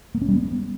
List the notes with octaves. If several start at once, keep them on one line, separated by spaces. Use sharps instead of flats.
A#3
C#4
G3
B3